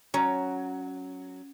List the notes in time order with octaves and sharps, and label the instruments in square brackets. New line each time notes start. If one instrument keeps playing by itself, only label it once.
[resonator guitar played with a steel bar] F#3 [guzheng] C#4 [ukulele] A#5